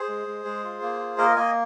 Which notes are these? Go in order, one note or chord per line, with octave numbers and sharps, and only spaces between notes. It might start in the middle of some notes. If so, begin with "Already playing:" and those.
Already playing: G#4 C5
G#3
G#3
G#3
F4
A#3
F4
A#3 A#4 D#5
A#3 D#5 G#5